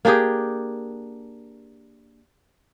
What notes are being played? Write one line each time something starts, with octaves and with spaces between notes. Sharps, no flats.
A#3 D4 G4 G#4